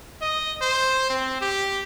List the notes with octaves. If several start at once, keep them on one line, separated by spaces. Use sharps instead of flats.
D#5
C5
C4
G4